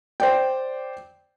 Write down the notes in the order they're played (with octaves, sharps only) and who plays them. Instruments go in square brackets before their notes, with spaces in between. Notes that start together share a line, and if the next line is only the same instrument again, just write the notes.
[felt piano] C5 D5 G5